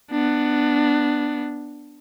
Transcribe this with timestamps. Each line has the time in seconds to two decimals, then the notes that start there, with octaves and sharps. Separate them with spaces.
0.11 B3 D4